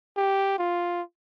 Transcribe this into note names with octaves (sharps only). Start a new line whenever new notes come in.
G4
F4